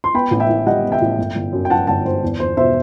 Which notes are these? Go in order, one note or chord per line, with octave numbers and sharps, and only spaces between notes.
C6
B3 G5 B5
A1
E5 G5
A2
G3 D#5 F#5
B3
E5 G5
A1
G1
G1
F#2
G5
F#3 F#5 A5
G1 F#5 A5
G1 C5
E2
E2 C5
B2 C5 E5